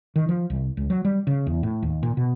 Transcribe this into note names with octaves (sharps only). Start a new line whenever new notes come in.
D#3
F3
C2
C#2
F#3
G3
C#3
E2
A2
D#2
A#2
B2